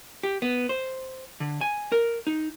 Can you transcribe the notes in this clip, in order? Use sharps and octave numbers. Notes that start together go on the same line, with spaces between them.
G4
B3
C5
D3
G#5
A#4
D#4